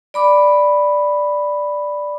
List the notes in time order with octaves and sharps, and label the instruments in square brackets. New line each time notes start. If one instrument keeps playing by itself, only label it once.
[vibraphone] D5 B5 D6